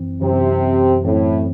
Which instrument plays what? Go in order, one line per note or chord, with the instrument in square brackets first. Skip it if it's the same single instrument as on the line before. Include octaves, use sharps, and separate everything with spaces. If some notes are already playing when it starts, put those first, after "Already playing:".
Already playing: [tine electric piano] F#2 E3 C4
[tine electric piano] F#2 E3 C4 [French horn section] C3
[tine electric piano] F#2 E3 C4 [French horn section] A2